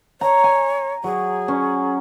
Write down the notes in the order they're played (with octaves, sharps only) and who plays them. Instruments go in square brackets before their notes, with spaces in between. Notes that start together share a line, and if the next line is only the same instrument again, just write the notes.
[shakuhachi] C#5 [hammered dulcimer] A#5
[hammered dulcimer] G#5
[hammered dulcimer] F#3 [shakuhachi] G#4
[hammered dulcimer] C#4